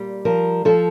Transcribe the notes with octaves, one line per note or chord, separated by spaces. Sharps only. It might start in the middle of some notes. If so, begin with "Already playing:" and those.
Already playing: A#2 G3
F3 A#4
F3 A4